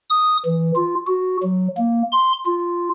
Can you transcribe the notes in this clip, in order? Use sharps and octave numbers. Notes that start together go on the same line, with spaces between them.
D#6
E3
F4
F#4
F#3
A#3
C6
F4